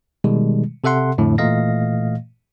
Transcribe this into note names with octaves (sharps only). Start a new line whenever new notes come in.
B2 D#3 G3 G#3
C3 A4 E5 F#5 C6
F2 A2 D3
A#2 E3 A3 D#5 F5 A#6